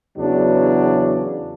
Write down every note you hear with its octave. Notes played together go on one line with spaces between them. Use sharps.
E2 C#3 F#3 D4